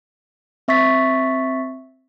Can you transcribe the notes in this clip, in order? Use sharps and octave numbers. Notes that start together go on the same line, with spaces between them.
C4 E5 C#6 A6 B6